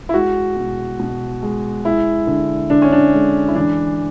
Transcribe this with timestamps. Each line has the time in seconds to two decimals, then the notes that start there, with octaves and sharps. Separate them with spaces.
0.09 E4
0.14 G#3 F#4
0.57 B2
1.00 B2
1.42 G#3
1.85 G#3 E4
2.27 D3
2.70 D3 D4
2.82 C#4
2.92 D4
3.14 G#3
3.48 E4
3.55 E3 D4